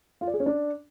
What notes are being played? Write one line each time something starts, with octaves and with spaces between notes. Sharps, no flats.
F4
D5
G#4
C#4
D4